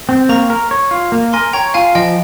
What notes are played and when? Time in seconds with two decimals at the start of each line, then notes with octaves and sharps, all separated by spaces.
0.09 C4
0.29 A#3 A#5 C#6
0.50 A#4
0.71 C#5
0.91 F4
1.12 A#3
1.33 A#4 G#5 C6
1.53 C#5 G5 A#5
1.74 F4 F5 G#5
1.95 F3 D#5 G5